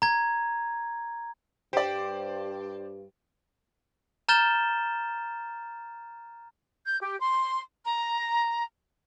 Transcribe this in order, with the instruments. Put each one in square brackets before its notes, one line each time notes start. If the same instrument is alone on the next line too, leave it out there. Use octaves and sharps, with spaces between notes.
[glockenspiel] A#5 G#6
[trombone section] G2 [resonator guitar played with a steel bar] G4 [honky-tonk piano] C5 D5
[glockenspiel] A#5 F6 G6 A6 E7 G7
[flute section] G6
G4
C6
A#5